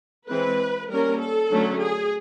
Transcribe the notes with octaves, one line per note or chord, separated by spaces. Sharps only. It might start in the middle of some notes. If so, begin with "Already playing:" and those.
E3 G#3 C4 B4
G3 A#3 C#4 A#4
A4
D3 F#3 A3 C#4
G#4